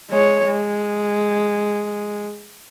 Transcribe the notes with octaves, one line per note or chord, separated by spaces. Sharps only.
G#3 C#5
G#3